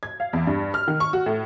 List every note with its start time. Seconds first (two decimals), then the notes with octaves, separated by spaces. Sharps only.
0.03 G#6
0.20 F5
0.33 E2
0.47 G2
0.74 F6
0.88 D#3
1.00 C#6
1.13 F#4
1.26 A2